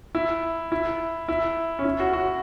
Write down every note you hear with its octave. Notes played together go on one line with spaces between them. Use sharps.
E4
E4
E4
C#4
E4
F#4
F#4